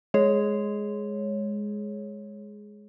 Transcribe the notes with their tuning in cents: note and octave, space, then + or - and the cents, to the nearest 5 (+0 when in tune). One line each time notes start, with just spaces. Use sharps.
G#3 +0 G#4 +10 C#5 -5